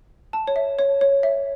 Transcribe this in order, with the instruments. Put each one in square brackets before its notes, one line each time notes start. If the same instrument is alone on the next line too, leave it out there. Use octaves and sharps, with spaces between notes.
[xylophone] A5
C#5
E5
C#5
C#5
E5